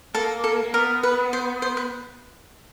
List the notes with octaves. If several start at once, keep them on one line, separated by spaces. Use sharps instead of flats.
A#3 A4
A4
A#3
B3 A#4
B4
C5
C5
B4